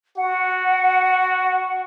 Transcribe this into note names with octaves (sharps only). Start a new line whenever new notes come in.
F#4 F#5